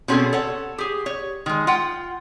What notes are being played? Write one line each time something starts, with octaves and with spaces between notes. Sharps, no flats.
B2 C4 C#4 F#4 G#4 A4
A4 C#5 F#5
G4 G#4
C#5
D#3 G#3
F4 F#5 G5